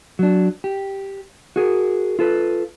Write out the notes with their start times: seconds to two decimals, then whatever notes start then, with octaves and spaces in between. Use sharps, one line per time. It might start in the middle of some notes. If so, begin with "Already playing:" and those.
0.19 F#3 D4
0.64 G4
1.56 F#4 G#4 A#4
2.19 F4 A4 B4